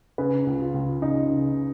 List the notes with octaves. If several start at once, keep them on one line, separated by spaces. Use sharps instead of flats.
C#3 B4
C#2
F4
C#2
C#3 D#4
C#3